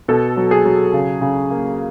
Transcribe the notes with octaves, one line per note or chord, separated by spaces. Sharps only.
B2 A4
F#3
G#4
F#3
C#3
C#3
A#3